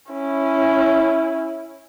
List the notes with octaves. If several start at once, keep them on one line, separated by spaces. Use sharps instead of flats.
C#4 E4